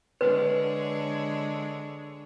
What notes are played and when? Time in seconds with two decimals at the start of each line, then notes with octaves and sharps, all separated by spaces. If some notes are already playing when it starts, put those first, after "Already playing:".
0.21 D3 G#3 B4 C#5